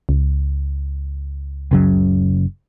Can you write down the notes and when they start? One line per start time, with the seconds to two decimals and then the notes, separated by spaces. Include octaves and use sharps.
0.09 C#2
1.71 F#1 C#3 F#3